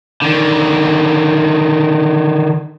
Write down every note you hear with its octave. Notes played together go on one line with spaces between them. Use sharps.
D3 D#3